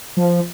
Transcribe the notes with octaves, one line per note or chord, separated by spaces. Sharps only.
F3